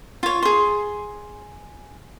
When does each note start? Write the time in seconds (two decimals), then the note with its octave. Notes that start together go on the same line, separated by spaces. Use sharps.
0.23 F4 C#5
0.42 G#4 C6